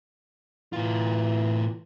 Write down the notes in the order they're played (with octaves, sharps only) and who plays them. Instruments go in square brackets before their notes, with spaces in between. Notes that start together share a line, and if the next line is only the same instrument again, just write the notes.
[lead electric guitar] A2 F4 [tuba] E3